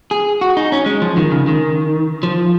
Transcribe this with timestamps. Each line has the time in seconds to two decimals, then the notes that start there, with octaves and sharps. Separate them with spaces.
0.11 G#4
0.41 F#4
0.57 D#4
0.72 C#4
0.86 G#3
1.02 F3
1.17 D#3
1.32 C#3
1.48 D#3
2.23 F3